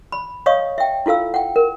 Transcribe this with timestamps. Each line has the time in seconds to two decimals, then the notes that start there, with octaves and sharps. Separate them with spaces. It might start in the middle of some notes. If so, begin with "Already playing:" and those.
0.12 B5
0.46 C#5 D#5 F5 C#6 D#6
0.78 E5 G5
1.06 E4 F4 A4 F5 E6
1.34 F#5 G5
1.56 A#4